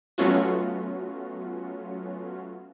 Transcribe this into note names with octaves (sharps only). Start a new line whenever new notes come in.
F#3 A3 B3 C#4 F4 F#4